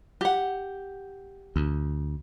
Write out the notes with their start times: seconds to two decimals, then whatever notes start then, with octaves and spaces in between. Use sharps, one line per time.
0.21 G4 F#5
1.56 D2